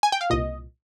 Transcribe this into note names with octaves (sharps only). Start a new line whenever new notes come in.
G#5
G5
F5
C2 A#2 D#5